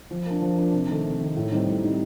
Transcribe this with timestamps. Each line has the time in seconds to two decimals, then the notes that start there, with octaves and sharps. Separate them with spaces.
0.11 F3
0.26 A#3 D4
0.42 F3
0.57 A#3 D4
0.73 C3
0.89 D#3 A3
1.05 C3
1.21 D#3 A3
1.36 A2
1.52 G3 C4 D#4
1.68 A2
1.83 G3 C4 D#4